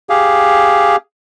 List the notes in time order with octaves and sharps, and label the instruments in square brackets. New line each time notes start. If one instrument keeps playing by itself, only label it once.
[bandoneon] G4 G#4 F5